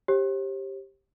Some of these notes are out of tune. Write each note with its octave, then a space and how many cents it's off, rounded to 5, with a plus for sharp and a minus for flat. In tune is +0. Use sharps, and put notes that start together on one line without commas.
G4 +0 C5 +45